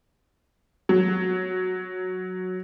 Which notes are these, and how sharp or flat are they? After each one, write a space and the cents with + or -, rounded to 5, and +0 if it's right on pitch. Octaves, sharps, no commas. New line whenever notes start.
F#3 -5